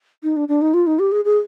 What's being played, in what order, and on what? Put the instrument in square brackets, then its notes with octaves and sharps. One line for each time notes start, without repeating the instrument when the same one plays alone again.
[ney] D#4
D4
D4
D#4
F4
D#4
G4
G#4
G#4